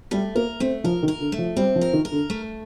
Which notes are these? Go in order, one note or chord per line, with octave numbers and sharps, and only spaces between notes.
G3 A3
A#3 A#4
A3 C4
F3 A#4
D#3
A#4
D3
A3
F3
G3 C4
F3
A#4
D#3
A#4
D3
A3